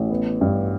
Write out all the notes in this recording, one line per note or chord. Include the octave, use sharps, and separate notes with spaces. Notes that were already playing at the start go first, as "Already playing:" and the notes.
Already playing: A1
B3
G2